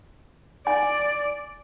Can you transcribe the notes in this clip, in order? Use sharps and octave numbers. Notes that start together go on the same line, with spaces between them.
D5 G#5